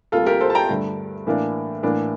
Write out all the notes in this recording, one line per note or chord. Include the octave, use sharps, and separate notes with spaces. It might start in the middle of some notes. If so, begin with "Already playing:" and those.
D2 C3 G3 A#3 F4 A4
G4 A#4
A4 C5
A5
G5 A#5
G2 D3 A3
A2 E3 A#3 D4
A2 E3 A#3 D4